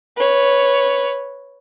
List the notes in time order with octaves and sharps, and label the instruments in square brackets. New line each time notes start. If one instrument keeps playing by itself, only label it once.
[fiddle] B4 C#5